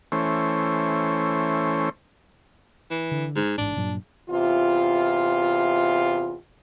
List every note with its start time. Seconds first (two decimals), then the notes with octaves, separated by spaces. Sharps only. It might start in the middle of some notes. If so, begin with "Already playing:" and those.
0.12 E3 A3 C#4 C5
2.91 E3
3.11 D3
3.36 G#2
3.58 A1 G#2 D4
3.76 G2 A#2 F#3
4.30 E2 C3 F4